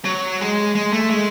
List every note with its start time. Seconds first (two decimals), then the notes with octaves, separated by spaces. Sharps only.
0.05 F#3
0.40 G#3
0.75 G#3
0.93 A3
1.11 G#3